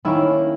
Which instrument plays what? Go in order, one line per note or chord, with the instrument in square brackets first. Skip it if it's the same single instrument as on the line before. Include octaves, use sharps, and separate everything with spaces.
[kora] D#3 A#3 C#4 E4